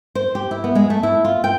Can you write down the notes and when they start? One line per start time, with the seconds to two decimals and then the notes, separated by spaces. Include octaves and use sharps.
0.15 C5
0.35 G4
0.51 E4
0.64 B3
0.75 G#3
0.90 A3
1.03 E4
1.25 F4
1.44 G5